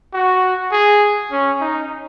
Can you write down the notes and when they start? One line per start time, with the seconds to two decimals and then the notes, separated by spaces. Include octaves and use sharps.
0.13 F#4
0.71 G#4
1.31 C#4
1.61 D#4